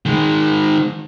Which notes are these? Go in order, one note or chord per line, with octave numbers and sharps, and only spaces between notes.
D#3 G#3